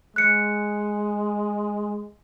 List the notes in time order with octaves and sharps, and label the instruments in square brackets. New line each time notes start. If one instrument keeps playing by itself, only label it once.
[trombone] G#3 [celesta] F#6 C#7